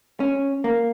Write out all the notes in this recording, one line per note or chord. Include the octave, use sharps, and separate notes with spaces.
C#4
A#3